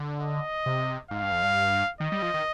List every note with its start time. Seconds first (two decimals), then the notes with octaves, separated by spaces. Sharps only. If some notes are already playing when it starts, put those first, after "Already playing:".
Already playing: D3
0.21 D#5
0.66 C3
1.11 G#2 F5
1.22 G2
1.32 F2
1.43 G2
2.00 D#3 D#5
2.12 G3
2.22 F3
2.34 D#3